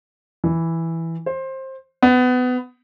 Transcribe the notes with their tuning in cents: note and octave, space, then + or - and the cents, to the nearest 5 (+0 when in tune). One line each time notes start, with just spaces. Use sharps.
E3 +0
C5 +20
B3 +25